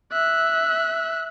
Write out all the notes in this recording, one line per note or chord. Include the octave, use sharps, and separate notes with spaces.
E5 F#6